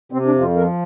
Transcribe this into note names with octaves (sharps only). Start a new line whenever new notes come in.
C3 C4
D4
F2
F4
F3 A#4